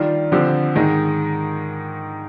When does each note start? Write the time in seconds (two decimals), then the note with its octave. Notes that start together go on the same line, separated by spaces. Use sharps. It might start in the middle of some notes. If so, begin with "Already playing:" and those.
Already playing: D#3 G3 D4 F4
0.32 D3 F3 C4 G4
0.75 G#2 D#3 G#3 D#4